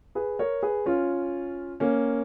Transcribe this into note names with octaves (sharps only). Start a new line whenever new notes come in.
G#4 B4
A#4 C#5
G#4 B4
C#4 F4
A#3 C#4